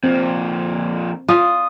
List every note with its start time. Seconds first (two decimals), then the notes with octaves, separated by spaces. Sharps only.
0.04 F2 A#2 C4
1.28 F4 D#6